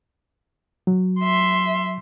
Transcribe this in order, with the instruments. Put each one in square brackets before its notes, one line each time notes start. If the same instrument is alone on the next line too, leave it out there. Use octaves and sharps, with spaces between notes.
[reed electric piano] F#3
[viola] E5 C6